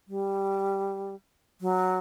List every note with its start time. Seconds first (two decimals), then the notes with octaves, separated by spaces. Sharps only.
0.08 G3
1.61 F#3